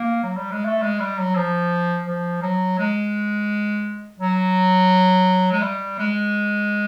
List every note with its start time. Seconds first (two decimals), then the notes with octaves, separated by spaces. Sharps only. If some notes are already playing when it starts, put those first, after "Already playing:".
Already playing: A#3
0.23 F#3
0.36 G3
0.51 G#3
0.65 A3
0.82 G#3
0.99 G3
1.18 F#3
1.35 F3
2.06 F3
2.42 F#3
2.78 G#3
4.20 F#3
5.52 G#3
5.62 G3
5.98 G#3